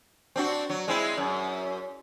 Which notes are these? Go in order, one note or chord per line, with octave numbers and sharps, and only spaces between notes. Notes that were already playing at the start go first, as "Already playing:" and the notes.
C4 D4 F#4
F#3
G#3 C4 E4
F#2